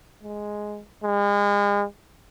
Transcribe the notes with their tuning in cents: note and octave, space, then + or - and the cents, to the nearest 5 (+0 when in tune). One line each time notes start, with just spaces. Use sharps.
G#3 +5
G#3 -40